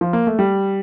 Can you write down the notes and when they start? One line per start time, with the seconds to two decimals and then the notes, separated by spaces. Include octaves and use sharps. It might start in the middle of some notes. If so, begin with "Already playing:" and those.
0.01 F3
0.13 A#3
0.27 A3
0.39 G3